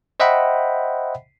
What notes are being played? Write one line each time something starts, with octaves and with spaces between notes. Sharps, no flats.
C5 D#5 E5 F#5 G5 B5